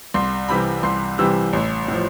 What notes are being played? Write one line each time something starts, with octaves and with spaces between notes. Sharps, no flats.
C2 C6
C3 E3 G3 B5
C2 C6
C3 E3 G3 E6
A1
A2 F3